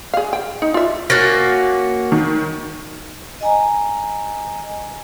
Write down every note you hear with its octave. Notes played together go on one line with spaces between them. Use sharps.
G#4 F5
G5
D#4
F4 E5
A#3 C#4 F#4 F#6 A6 A#6
D#3
D#5 G#5 A#5